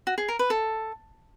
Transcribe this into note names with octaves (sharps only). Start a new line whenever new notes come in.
F#4
G#4
A#4
B4
A4